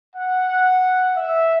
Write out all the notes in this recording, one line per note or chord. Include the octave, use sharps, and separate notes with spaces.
F#5
E5